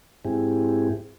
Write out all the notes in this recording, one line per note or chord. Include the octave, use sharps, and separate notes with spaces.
G#2 C4 E4 G4 G#4